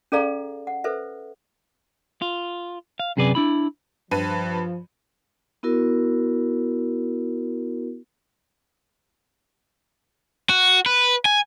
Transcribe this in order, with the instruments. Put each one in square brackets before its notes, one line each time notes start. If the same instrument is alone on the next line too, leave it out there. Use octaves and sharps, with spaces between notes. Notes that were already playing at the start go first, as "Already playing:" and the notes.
[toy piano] C#4 G#4 A4 D5 F5 A#5
F#5
A4 B4 C5 E5
[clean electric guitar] F4
F5
F#2 C3 G#4 B4 D5 G#5
D4 E4 B5
[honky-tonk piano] G2 B4 D#7 [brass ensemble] F3
[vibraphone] B3 E4 F#4 A#4
[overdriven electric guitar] F#4
B4
G#5